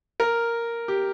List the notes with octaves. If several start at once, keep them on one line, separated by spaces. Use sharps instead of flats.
A#4
G4